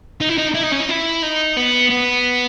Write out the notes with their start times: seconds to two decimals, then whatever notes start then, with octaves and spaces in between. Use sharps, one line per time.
0.21 D#4
0.29 E4
0.38 D#4
0.54 E4
0.63 D#4
0.71 C#4
0.80 D#4
0.89 E4
1.22 D#4
1.56 B3
1.90 B3